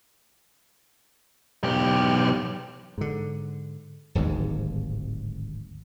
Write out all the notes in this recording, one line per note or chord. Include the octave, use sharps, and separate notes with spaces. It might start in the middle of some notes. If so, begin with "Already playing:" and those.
B1 G4
G#2 D3
D1 G#1 D#2 G#2